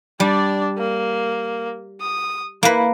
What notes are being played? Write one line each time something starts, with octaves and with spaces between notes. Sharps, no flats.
G3 D4 D5
A#3
D#6
A#3 E4 B4